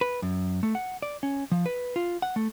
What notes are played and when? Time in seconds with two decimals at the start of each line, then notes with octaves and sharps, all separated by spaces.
0.01 B4
0.22 F#2
0.63 A3
0.75 F#5
1.02 D5
1.23 C#4
1.52 F3
1.66 B4
1.96 F4
2.22 F#5
2.36 A3